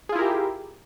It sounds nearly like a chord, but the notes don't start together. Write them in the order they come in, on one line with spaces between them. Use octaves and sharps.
G#4 F4 E4 A#4 G4